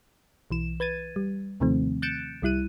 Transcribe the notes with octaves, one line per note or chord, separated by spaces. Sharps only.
B1 E3 E7
B4 G#6 A6 D#7
G3
D#2 C3 D#3 F3 A3 C4
F#6 G6 A6 C#7 D7 E7
C2 G3 E4 F#6 D#7